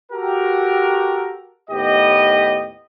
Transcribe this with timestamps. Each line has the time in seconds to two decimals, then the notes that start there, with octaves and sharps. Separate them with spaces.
0.11 F#4 G4 A4 A#4
1.70 D#2 A2 B3 G4 D#5